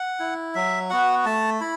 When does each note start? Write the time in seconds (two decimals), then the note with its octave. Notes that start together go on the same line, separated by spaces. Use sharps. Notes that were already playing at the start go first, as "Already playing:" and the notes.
Already playing: F#5
0.20 E4
0.55 F#3 E5
0.90 B3 F#4 F#5
1.25 A3 A5
1.61 E4 B5